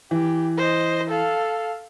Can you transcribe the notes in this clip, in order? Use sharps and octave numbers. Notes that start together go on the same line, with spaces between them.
E3 G4
C5 D#5
A4 F5